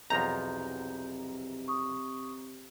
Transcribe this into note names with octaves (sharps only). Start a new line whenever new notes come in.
B1 E2 C3 F3 A#5 G6
C#6 D#6